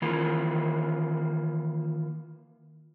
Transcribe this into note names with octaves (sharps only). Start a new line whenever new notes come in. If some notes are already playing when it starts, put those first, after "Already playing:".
D#3 E3 A#3 F4